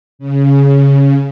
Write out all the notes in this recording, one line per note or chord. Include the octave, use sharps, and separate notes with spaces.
C#3